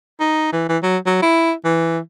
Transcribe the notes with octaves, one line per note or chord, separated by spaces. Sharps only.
D#4
E3
E3
F#3
F#3
E4
E3